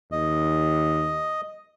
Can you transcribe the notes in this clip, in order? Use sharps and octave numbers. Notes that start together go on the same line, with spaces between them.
D#2 D#5